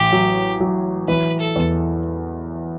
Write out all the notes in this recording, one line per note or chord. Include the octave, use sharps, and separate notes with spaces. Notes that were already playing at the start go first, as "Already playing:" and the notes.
Already playing: A1 G4
F#3
F#3
E3 B4
A4
E2